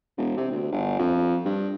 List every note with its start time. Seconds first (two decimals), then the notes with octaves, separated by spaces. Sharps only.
0.17 E1
0.37 C3
0.51 D2
0.72 G1
0.99 F2
1.45 G2